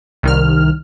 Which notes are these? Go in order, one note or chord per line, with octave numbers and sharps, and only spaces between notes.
C2 D#3 F6